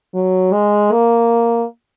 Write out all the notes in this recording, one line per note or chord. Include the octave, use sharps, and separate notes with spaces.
F#3
G#3
A#3